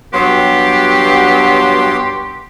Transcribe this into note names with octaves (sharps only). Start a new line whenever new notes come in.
G2 F#3 B3 G4 C6